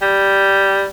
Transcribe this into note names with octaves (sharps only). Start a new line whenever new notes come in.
G3